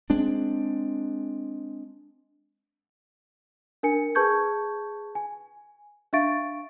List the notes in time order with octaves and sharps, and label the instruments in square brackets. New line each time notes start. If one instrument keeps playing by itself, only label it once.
[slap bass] G#3 C4 D4
[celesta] D4 A#4 G#5 C#7
G#4 B4 A5 C#6 G6 G#6
G#5
D4 E5 F5 C#6 A6 D7